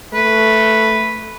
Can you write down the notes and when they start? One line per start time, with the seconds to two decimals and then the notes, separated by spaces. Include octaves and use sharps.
0.14 A3 B4